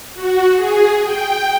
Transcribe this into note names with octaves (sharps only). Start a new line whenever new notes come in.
F#4
G#4
G5